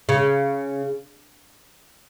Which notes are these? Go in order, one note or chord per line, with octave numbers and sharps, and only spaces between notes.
C#3